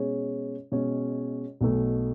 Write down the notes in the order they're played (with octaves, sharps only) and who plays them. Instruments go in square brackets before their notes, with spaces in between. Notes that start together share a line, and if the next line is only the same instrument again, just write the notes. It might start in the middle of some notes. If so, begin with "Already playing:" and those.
Already playing: [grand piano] B2 G#3 C#4 G#4 C#5
B2 G#3 C#4 G#4 C#5
B1 B2 A3